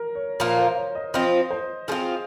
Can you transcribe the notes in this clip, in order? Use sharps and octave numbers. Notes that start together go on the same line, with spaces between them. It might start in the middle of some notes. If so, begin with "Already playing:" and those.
Already playing: A#4
C#5
A#2 F3 A#3 F4 A#4
C5
C#5
D#5
F3 C4 F4 D#5
C5
F3 C4 F4 G#4